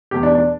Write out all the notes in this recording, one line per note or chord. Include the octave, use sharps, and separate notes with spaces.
E2 B2 G4
D4
D4